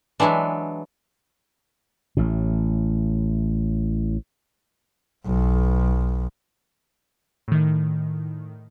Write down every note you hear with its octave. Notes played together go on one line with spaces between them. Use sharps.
E3 F#3 G#3 D4 E4
A1 A2
B1
A2 D#3